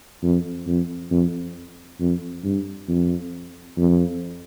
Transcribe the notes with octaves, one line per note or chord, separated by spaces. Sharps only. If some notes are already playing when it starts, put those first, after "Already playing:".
F2
F2
F2
F2
G2
F2
F2